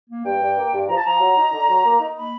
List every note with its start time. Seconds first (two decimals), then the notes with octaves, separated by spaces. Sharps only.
0.09 A#3
0.24 G2 G5
0.41 G2
0.57 A#3
0.73 G2
0.89 F3 A#5
0.96 A5
1.05 F3 A#5
1.21 F#3
1.36 D#4
1.52 D3
1.68 F#3
1.84 A#3
1.99 D#4
2.16 A#3 B5